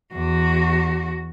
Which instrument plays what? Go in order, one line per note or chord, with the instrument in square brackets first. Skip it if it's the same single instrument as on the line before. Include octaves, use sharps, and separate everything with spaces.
[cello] E2 F#4